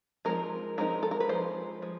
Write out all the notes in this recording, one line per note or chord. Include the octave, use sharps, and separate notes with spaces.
F3 G#3 C4 D#4 A#4
F3 G#3 C4 D#4 A#4
A4
A#4
B4
F3 G#3 C5
F3 G#3